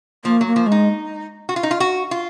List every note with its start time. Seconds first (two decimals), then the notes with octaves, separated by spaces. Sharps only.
0.25 F3 A#3
0.41 F#3
0.46 A#3
0.56 F3
0.66 G#3
0.72 D#4
1.49 F#4
1.56 F4
1.63 D#4
1.71 F4
1.80 F#4
2.11 F4